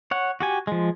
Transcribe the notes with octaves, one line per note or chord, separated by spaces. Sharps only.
C#5 F#5
F#4 G4 G#5
F3 G#3